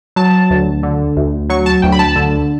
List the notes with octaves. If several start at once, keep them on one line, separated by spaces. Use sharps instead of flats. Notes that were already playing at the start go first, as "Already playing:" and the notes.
F#3 A5
D2
D3
D2
F#3 C#6
A5
D2 G5
B5
A5
D3